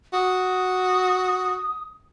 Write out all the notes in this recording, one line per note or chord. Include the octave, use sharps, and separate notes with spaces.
F#4 D#6